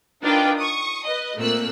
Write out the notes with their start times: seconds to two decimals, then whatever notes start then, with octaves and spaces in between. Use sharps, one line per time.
0.24 D4 D#4 F4 A#4 B4 G5
0.58 C#6 D#6
1.05 B4 D#5
1.37 A#2 A3 A#3 C4 E6 F#6